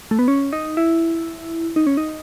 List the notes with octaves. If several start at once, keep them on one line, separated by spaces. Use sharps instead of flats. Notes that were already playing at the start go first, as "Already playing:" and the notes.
A3
B3
C#4
D#4
E4
D#4
C#4
D#4